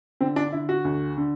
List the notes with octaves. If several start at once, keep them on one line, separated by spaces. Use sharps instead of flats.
D3 C4
D4
D3 E4
F#4
D2
D3